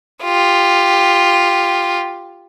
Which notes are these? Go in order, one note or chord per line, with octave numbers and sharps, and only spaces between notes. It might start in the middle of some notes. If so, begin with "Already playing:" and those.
F4 G4